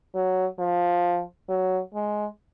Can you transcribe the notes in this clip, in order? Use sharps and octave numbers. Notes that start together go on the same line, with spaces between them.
F#3
F3
F#3
G#3